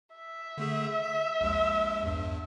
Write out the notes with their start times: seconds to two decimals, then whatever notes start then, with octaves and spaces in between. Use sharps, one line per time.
0.15 E5
0.58 D3 A3 G#4
1.03 B6
1.41 A#1 D#2 G#3
2.03 E2 G2